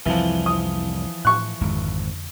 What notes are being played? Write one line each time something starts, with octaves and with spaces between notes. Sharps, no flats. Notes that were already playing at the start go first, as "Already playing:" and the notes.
C2 F2 E3 F3
D#6
A2 C#6 F#6
G#1 F2 D3 G#3